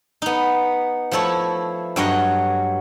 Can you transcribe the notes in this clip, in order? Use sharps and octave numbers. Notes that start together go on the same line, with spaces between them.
B3 D#4
F3 A3 E4 A4 C#5
G2 F#3 C#5 D#5